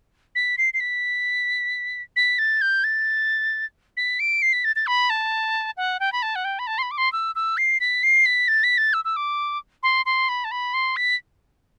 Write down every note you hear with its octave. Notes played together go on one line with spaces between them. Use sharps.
B6
C7
C7
B6
B6
A6
G6
A6
B6
D7
C7
B6
A6
A6
B5
A5
F#5
G5
B5
A5
F#5
G5
B5
A5
C6
B5
D6
C6
E6
E6
C7
B6
C7
B6
A6
B6
A6
E6
E6
D6
C6
C6
B5
A5
B5
C6
B6